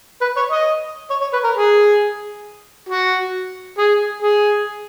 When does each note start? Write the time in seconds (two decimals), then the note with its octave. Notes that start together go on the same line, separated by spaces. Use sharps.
0.21 B4
0.37 C#5
0.52 D#5
1.10 C#5
1.21 C#5
1.33 B4
1.44 A#4
1.55 G#4
2.89 F#4
3.78 G#4
4.22 G#4